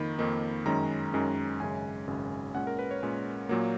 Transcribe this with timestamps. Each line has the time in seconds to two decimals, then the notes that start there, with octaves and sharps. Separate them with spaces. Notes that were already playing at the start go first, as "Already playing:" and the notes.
Already playing: F2 D#3 A#3 D#4 B5
0.18 F2 D#3 A#3 D#4
0.66 F#2 D#3 G#3 C#4 A#5
1.13 F#2 D#3 G#3 C#4
1.60 G#1 F#2 C#3 G#3 G#5
2.07 G#1 F#2 C#3 G#3
2.55 A#2 G#3 C#4 F#5
2.67 A#4
2.79 B4
2.91 C#5
3.03 A#2 G#3 C#4
3.49 A#2 F#3 A#3